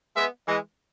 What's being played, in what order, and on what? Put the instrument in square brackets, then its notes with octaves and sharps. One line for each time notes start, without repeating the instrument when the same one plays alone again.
[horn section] G#3 B3 [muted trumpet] E5
[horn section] E3 G#3 [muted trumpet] D#5